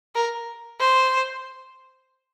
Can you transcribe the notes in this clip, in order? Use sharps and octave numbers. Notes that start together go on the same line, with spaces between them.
A#4
C5